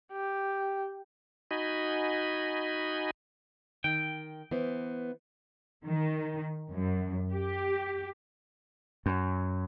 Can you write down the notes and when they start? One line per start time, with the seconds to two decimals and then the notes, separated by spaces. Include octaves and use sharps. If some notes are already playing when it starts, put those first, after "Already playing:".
0.12 G4
1.51 D#4 F#4 D#5 G#5 B5
3.84 D#3 G5
4.51 E3 B3 C5
5.84 D#3
6.72 F#2
7.31 G4
9.06 F#2